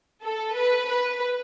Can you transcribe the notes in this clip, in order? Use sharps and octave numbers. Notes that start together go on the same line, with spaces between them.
A4
B4
B4